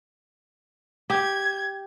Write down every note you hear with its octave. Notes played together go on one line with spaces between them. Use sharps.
G4 G#6